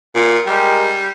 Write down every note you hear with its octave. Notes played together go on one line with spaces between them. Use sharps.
A#2
G3 G#3 G4 A#4